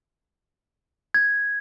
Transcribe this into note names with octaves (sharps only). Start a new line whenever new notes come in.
G#6